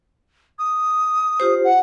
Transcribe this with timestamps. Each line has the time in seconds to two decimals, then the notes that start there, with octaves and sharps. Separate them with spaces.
0.59 D#6
1.40 F4 G4 C5
1.64 F#5